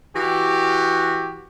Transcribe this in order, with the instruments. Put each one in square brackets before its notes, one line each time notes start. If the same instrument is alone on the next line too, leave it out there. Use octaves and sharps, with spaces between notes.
[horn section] E3 F#4 G4